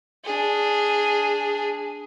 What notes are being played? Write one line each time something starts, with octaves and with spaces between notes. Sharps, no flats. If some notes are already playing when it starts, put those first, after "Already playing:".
D4 G#4